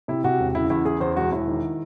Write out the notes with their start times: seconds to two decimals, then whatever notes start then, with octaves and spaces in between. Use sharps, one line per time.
0.08 C3 E4
0.24 C3 F#4
0.40 E1
0.55 C#3 E4
0.70 E2 E4
0.85 C#3 G#4
1.00 E2 C5
1.16 E1 F#4
1.32 E1 E4
1.47 D#3